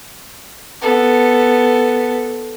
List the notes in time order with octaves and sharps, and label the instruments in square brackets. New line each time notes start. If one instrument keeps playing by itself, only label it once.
[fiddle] B3 A4